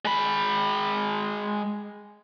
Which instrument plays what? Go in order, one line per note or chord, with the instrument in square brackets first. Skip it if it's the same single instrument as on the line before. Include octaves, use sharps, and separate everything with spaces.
[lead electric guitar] G#3 B5